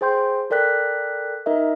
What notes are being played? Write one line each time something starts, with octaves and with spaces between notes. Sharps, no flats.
G#4 C5 G5 C6 G6
A4 A#4 D5 G5 F#6 B6
D#4 A#4 D#5 E5